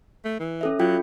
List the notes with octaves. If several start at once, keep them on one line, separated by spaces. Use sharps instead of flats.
A3
E3
C#4 A4 E5
F#3 F4 G5